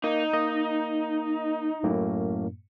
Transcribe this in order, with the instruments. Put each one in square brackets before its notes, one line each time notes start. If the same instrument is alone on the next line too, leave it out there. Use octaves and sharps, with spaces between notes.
[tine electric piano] A#3 [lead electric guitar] D#4
[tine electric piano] A#3 D#5
F#2 A2 A#3